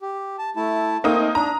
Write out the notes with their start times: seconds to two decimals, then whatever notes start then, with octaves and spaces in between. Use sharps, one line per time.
0.02 G4
0.39 A5
0.56 A3 E4 A5
1.04 A3 A#3 C4 D#4 D#6
1.35 D4 A#5